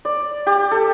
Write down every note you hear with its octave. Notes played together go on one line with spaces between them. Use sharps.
D5
G4
A4